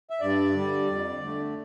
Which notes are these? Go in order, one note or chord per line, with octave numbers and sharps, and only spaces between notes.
E5
G2 D5
D3 G3
F2
D3 A3